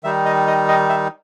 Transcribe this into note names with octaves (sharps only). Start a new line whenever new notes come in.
D#3 G3 D#4 E5
D#5
D#5
D#5
E5